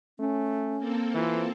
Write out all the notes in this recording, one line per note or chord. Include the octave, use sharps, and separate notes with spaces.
A3 C#4
A#3 C4 A4
E3 F4